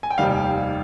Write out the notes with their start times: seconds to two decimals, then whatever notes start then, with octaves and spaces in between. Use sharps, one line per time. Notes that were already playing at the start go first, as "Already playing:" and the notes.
0.03 G#5
0.10 G5
0.18 F1 D#2 D#3 G3 F5